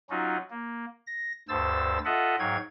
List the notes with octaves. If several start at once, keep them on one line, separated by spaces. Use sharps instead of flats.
F#3 C#4 D#4 F4 F#4
A#3
A#6
D2 G2 C5 E6 A6
F4 A4 D#5 E5 F#5
G#2 F#3 C#5 F5 G5 G#6